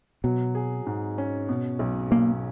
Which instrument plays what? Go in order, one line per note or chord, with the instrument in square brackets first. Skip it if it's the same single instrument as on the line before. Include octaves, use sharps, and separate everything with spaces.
[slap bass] B2 [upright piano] F#3
[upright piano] G#4
G#2
C#4
B2
B1
[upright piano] B1 [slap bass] A#3